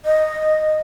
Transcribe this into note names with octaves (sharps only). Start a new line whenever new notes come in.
D#5